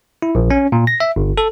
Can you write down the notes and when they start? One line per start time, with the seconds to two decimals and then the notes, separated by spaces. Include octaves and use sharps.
0.22 E4
0.35 A#1
0.51 C#4
0.72 A#2
0.87 A#6
1.00 E5
1.16 G1
1.38 A4